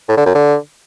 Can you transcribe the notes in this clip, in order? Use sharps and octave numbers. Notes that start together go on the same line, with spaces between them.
A2
D3
F#2
D3